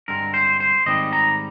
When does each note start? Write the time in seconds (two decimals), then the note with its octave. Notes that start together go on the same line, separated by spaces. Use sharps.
0.08 G2 D3 G#3 C4 A#4
0.34 C5
0.60 C5
0.86 G#2 D#3 G3 C4 D#5
1.13 A#5